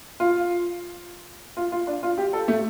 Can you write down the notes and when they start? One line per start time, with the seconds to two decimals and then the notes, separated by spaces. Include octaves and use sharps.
0.20 F4
1.57 F4
1.72 F4
1.87 D4
2.03 F4
2.18 G4
2.33 A4
2.48 A3